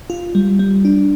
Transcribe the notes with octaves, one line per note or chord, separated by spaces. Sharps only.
F4
G3
G3
D4